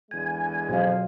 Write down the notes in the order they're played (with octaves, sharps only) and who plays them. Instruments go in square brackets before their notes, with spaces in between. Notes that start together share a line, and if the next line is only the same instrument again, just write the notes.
[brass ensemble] E2 D3 G#3 [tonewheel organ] G#5
[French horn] F2 [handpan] B2 F#3 F5